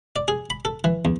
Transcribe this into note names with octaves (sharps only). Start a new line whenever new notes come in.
D5
G#4
B5
A4
E3
E2